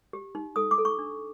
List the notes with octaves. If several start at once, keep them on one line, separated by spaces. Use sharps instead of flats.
G4
D#4
A4 D#6
D6
A4
C#6
D4